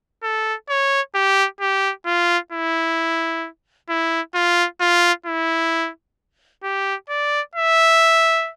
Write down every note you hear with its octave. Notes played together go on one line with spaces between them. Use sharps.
A4
C#5
G4
G4
F4
E4
E4
F4
F4
E4
G4
D5
E5